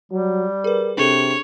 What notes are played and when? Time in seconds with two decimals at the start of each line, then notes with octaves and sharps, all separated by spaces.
0.12 F#3 G3
0.64 G#4 A#4 B4
0.98 C3 D4 G#4 A4 C#5